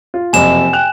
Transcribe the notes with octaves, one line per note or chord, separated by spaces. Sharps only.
F4
F#1 F2 C3 G#5 E7
G5 F#6 F7